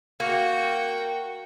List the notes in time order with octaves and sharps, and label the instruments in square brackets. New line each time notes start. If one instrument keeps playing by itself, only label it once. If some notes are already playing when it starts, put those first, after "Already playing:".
[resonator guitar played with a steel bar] A#3 [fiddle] F#4 G5